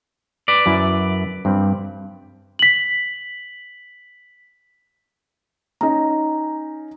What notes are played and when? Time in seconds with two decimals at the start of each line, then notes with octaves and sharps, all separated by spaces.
0.48 B4 D5
0.66 F#2 E4
1.45 G2 C4
2.59 B6 F#7
5.81 C#4 D#4 A#5